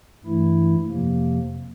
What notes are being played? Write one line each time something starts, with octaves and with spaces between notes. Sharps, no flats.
G2 E3 A3 E4
F2 C3 F3 A#3